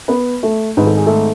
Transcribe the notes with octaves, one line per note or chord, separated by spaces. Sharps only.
B3 B4
A3 A4
G#1 G#2 G#3 B4
A4
G#4
A3 A4